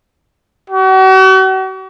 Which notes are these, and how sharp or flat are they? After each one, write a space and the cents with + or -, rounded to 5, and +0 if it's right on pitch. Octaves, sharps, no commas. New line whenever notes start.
F#4 +40